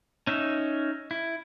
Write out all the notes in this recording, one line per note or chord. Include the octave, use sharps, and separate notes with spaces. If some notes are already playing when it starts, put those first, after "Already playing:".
C#4 D#4 E5
E4